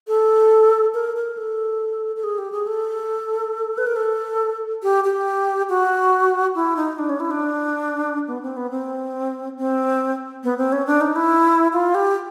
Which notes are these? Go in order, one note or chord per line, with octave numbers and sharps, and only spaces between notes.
A4
A#4
A#4
A4
A4
G#4
G4
G#4
A4
B4
A#4
A4
G4
G4
F#4
E4
D#4
D4
C#4
E4
D4
B3
C4
B3
C4
C4
B3
C4
C#4
D4
D#4
E4
F4
G4